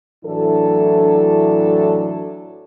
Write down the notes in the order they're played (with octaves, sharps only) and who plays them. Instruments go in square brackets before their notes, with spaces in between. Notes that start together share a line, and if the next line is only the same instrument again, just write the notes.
[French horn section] A2 E3 F#3 D4 A4